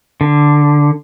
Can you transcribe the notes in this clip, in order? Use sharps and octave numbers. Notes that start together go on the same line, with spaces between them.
D3